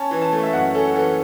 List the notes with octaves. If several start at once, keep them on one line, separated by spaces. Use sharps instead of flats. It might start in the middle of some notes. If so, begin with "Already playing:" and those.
Already playing: C#4 A5
E3
A5
A3
E5
F#2 F#5
C#4 A4
E3 A4